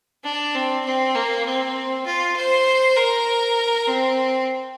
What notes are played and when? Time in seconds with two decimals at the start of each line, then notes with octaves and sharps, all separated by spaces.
0.24 D4
0.54 C4
0.85 C4
1.15 A#3
1.45 C4
2.06 F4
2.36 C5
2.96 A#4
3.87 C4